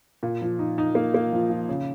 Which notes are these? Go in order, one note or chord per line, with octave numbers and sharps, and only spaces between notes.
A#2
F3
D#4
D#4
A#3
A#3
F3
F3
C#3